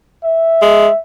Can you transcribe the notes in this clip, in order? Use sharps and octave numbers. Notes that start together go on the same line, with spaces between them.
E5
G#3